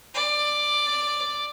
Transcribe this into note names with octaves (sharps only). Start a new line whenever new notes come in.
D5